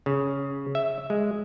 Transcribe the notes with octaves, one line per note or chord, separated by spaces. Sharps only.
C#3
E5
G#3